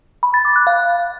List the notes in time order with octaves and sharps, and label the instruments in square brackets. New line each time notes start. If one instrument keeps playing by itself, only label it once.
[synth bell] B5
A6
D6
F#6
F5